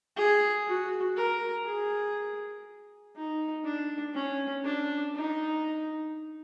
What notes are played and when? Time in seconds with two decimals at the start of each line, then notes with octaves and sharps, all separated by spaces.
0.16 G#4
0.67 F#4
1.16 A#4
1.66 G#4
3.16 D#4
3.65 D4
4.14 C#4
4.64 D4
5.15 D#4